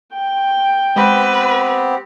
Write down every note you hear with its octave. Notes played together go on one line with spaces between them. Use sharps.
G5
G#3 B3 C4 G4 B4 B5